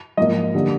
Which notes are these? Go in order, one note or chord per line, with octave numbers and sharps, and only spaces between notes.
G#2 F3 A#3 D#5
D3 G3 A#3